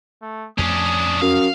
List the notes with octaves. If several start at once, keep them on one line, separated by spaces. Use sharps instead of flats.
A3
F2 F3 A3 C#4 D4 D#6
F#2 F5